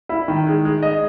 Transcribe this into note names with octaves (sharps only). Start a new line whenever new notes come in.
E4
D#3
G#3
G#3
D#5